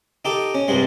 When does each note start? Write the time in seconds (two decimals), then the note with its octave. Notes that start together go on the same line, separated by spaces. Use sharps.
0.25 D#4 G4 A4
0.54 C#4
0.68 C2 G2 G3 G#3